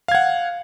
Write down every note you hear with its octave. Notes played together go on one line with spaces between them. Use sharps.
F5 F#5 G#6